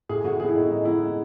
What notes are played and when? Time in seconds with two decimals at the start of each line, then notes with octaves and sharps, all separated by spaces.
0.09 A2 G#4
0.24 A2 F#4
0.40 B3 G#4
0.49 E4
0.55 A2 D#4
0.70 G#3 D#4
0.85 B3 E4
1.02 G#3